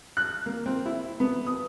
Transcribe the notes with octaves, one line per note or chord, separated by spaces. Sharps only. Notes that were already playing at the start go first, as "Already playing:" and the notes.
F#6
A#3
C4
E4
B3
D#6